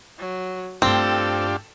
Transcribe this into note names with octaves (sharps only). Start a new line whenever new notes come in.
F#3
G2 A3 C4 D4 F4 G4 A4